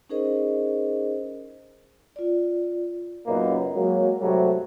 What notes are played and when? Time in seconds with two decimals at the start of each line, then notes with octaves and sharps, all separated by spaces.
0.09 C#4 D#4 G#4 A#4 C5 D#5
2.16 F4 D5
3.27 F#2 A#2 C#3 A#3 B3 D#4
3.75 F#3 G#3 A#3
4.21 G#2 C3 F#3 G3 A3